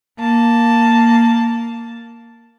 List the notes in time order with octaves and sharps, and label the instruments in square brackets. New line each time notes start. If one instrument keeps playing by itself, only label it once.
[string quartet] A#3 A5